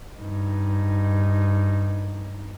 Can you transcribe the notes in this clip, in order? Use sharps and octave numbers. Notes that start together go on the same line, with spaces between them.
G2 D#4